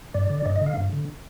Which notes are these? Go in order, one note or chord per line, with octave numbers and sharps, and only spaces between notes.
G2 D5
D3
G2 D#5
D#5
D3
F5
G2
D3